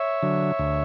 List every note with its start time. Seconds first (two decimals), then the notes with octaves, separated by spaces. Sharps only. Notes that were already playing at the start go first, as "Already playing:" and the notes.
Already playing: C#5 E5
0.22 D3 F#3
0.59 D2